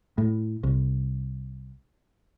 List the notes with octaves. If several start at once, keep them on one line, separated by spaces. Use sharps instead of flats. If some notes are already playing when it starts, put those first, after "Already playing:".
A2
C2